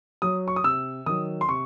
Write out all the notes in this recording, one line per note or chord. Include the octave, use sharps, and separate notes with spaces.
F#3 D#6
C#6
D#6
C3 E6
D#3 F#3 D#6
C6
C3 C#6